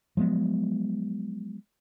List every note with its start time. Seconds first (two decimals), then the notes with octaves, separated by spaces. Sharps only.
0.17 F3 F#3 G#3 B3